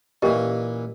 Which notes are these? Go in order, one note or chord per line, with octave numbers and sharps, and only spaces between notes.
A#2 E3 C#4 G4 D#5